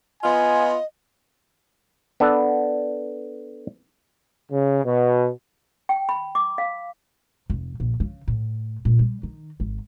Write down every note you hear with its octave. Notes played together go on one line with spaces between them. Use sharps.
B3 F4 D#5 G#5
B3 D4 A4
C#3
B2
G5
B5
D6
F5
F1
A#1
C#3
A2
A#2
G3
D#3
G#1